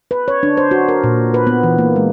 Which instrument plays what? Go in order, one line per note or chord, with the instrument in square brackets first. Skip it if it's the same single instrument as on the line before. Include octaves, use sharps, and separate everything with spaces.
[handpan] B4
C#5
D4
C5
F#4
A#4
A#2
B4
B3
E3
A#3
G#3